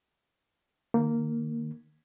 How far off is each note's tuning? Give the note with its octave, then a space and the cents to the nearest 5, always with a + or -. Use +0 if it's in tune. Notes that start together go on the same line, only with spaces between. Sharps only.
D#3 -30 A#3 -10